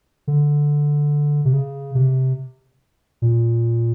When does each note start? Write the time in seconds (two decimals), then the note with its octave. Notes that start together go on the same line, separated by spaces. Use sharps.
0.27 D3
1.45 C3
1.53 C#3
1.95 C3
3.22 A#2